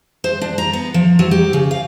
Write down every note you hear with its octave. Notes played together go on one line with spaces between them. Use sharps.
C5
D4
A#5
B3
F3
F#3
G4
C#3
F5